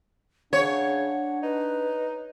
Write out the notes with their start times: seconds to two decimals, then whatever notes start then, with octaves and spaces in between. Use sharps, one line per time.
0.53 C#3 D4 C#5 F#5
1.43 D#4 B4